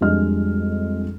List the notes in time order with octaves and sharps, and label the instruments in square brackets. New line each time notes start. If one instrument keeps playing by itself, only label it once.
[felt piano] F2 G3 G#3 D4 D#5 F6